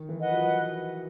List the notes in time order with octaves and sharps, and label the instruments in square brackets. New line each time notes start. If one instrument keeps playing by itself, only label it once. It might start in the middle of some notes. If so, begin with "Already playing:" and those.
Already playing: [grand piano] D#3
E3
[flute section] B4 D#5 F#5
[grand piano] F3
F#3